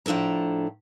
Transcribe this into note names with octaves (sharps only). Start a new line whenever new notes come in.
A2 F3 D4 A4 A#5